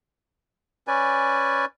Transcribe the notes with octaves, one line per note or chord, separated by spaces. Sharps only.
C#4 B4 D5 G#5